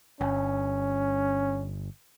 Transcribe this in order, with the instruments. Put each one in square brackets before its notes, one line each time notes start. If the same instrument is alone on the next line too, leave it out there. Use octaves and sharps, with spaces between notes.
[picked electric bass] G1 [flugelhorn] C#4